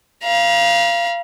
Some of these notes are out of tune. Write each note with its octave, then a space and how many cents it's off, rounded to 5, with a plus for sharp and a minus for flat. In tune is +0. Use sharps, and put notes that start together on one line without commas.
F5 -20 A#5 +45